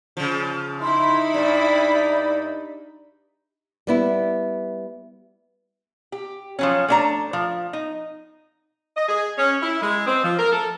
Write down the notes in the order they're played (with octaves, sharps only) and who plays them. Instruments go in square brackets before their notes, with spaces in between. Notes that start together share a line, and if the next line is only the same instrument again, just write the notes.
[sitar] C#3 F3
[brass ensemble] D#4 [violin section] E4 B5 [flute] C6
[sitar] G2 [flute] D5
[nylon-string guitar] G3 B3 E4
[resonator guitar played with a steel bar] G4
F3 F#3 C#4
A3 D4 A#5
F3
D#4
[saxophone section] D#5
G#4
C#4
E4
G#3
C4
F3
A#4
A4